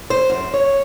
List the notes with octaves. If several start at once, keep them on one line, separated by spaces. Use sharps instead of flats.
C5
F#2
C#5